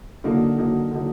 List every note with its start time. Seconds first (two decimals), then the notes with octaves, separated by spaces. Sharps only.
0.24 D3 F#3 A#3 D#4
0.57 D3 F#3 A#3 D#4
0.91 D3 F#3 A#3 D#4